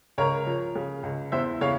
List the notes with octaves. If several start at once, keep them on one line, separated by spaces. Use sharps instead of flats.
C#2 A#4 C#5
F3
C#3
C#2
E2 C5 E5
C#3 C#5 F5